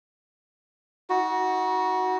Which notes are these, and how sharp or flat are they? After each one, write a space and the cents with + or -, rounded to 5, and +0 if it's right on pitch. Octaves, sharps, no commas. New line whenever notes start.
D#4 +40 F#4 +0